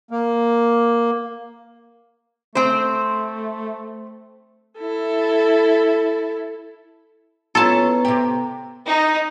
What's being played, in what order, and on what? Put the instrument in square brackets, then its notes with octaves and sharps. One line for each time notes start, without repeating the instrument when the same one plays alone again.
[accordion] A#3
[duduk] A3 [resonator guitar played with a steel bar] C4 C5
[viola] E4 A4
[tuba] B3 [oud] C#4 E4 F4 [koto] A4 A5 [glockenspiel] A#5
[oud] C3 G4
[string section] D#4